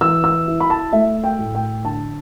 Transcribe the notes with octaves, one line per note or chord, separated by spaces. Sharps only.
E3 E6
E6
E4
B5
A5
A3 E5
G5
A2
G5
D3 A5